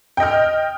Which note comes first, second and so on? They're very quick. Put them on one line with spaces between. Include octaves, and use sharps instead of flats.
G5 D#5 F6